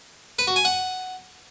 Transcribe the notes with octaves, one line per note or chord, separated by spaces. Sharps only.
B4
F#4
G#5
F#5